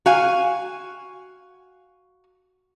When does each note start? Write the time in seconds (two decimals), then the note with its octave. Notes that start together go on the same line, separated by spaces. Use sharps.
0.06 F#4 F5 G#5